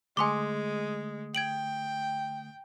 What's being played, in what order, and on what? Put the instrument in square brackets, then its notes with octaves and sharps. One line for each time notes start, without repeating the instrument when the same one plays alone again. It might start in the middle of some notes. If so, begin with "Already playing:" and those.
[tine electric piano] D3 A3 D#6 [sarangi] G#3 [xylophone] G#5 C6 D6
[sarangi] G5 [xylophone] G#6 D7 F#7